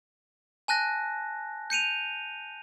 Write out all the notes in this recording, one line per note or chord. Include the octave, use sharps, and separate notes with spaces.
G#5 A5 F#6 A#6
G6 C#7 D#7 F7